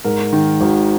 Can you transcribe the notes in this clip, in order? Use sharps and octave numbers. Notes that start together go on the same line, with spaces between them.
G#2 A#4
D#3
G#1